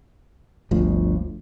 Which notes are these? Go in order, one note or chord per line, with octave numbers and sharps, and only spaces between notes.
G1 D2 F3